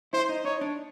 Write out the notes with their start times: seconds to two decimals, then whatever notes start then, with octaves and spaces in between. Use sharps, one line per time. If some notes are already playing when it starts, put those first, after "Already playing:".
0.13 E4 C5
0.29 D#4
0.45 D#4 C#5
0.61 D4